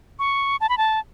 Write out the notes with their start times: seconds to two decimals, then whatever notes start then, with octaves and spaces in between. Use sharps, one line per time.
0.19 C#6
0.61 A5
0.69 B5
0.78 A5